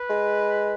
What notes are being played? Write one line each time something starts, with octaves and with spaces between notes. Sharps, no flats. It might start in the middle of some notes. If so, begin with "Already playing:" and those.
Already playing: B4
G#3